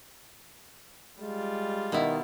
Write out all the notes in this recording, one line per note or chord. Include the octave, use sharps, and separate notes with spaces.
G3 G#3 F4
B2 D#3 E4